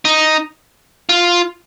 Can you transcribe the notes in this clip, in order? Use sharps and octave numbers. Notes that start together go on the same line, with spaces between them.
D#4
F4